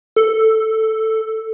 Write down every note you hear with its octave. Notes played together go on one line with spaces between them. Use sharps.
A4